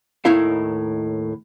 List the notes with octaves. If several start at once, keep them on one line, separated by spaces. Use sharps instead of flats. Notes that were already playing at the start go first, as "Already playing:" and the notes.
D#2 A2 D#3 E4 F5